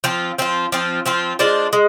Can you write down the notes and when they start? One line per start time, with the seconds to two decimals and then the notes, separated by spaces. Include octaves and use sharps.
0.04 F3 C4 F4
0.38 F3 C4 F4
0.72 F3 C4 F4
1.06 F3 C4 F4
1.39 G#3 D4 F4 C5
1.73 G#3